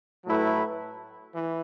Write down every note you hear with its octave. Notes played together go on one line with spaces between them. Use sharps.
A2 F#3 A3 E4 B4
E3